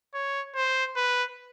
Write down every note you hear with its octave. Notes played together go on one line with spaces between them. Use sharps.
C#5
C5
B4